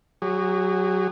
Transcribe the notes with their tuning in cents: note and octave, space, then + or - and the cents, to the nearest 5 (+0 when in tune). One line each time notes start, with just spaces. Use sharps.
F#3 +10 G#4 -35